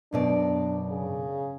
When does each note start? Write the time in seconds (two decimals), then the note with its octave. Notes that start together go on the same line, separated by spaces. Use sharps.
0.13 F#2 B2 D4 D5
0.90 C#3